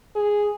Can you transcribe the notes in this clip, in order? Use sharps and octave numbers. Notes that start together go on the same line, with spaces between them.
G#4